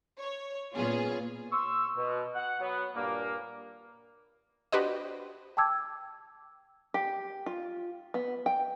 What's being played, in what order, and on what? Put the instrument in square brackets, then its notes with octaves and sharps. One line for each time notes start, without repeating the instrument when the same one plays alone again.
[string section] C#5
A#2 B3 C#4 F4 G#4
[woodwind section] C6 C#6 E6
B2
F#5
F#3 B3
G2 A#2 A#3
[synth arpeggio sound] D4 F#4 G4 B4 C5 D#5
[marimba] G5 A5 D6 E6 G#6
[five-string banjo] G4
F4
B3
G5